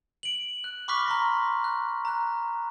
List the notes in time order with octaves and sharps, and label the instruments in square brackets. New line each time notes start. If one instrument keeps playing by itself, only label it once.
[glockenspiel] D7 F#7
F#6
B5 C#6 D6 F6 F#6 B6
A#5 C6 A#6
F#6
A#5 F#6